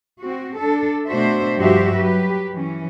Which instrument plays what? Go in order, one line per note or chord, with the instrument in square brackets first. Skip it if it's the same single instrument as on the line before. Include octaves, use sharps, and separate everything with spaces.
[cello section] C4 F#4
D4 A4
B2 A3 D4 F#4 C5 E5
G2 F3 F#4 G4 C5 E5
F#3 G4 B4
E3 C#4